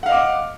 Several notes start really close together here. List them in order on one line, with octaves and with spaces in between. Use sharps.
F#5 F5 D#5 D6